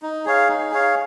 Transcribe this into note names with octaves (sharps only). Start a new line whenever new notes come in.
D#4
G#4 C#5 F5
D#4
G#4 C#5 F5